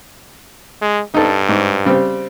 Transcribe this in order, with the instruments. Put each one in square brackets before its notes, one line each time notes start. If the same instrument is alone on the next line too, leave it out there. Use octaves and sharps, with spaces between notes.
[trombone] G#3
[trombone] G2 [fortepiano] D#4 A4
[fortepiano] G#2
C#3 G3 C4